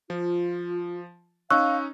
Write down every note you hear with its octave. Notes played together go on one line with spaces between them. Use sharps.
F3 F4
C#4 D#4 F5 C#6 E6 F#6